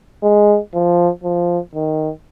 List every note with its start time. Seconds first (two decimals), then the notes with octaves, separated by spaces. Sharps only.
0.23 G#3
0.74 F3
1.24 F3
1.74 D#3